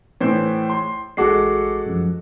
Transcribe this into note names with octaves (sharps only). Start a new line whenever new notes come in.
A2 E3 C5
C6
A1 G#3 F#4 A4 D6 C7
F#2 F3